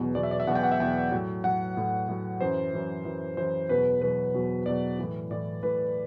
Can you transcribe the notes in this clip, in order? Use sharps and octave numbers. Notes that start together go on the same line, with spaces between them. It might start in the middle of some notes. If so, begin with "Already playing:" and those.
Already playing: E2 B2 F#3
E2 B2 F#3 D5
E5
D5
E5
E2 B2 F#3 F#5
G5
F#5
E5
E2 B2 F#3 G5
A2 F#3
A2 F#3 F#5
A2 F#3
A2 F#3
F#2 E3 C5
F#2 E3
F#2 E3
F#2 E3 C5
E2 B2 F#3 B4
E2 B2 F#3 B4
E2 B2 F#3
E2 B2 F#3 D5
A2 E3
A2 E3 D5
A2 E3 B4